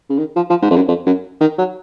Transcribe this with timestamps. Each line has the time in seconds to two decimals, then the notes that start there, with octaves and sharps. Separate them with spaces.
0.10 C#3
0.18 D#3
0.36 F3
0.50 F3
0.62 G#2
0.71 F2
0.76 F#2
0.88 F2
1.07 F#2
1.41 D#3
1.58 F#3